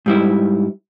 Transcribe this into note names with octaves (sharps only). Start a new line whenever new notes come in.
G#2 G3 E4